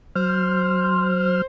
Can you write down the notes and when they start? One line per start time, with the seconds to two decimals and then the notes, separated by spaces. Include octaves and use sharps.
0.16 F#3 C5 F6